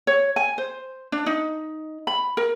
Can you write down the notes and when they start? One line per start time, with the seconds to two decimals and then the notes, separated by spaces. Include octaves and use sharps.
0.07 C#5
0.36 G#5
0.58 C5
1.12 D4
1.26 D#4
2.07 B5
2.37 A#4